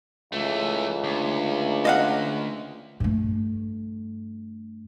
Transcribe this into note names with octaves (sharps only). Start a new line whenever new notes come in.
C#2 E3 A3
D2
D#5 F5 F#5
G2 A3